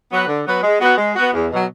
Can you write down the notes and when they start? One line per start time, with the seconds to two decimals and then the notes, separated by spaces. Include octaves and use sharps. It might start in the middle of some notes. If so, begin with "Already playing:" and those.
0.11 F#3 B3 F#4 B4
0.28 D3
0.46 F#3 B3 F#4 B4
0.63 G#3
0.80 B3 F#4
0.98 G#3
1.16 B3 F#4
1.33 E2
1.51 B2 F#3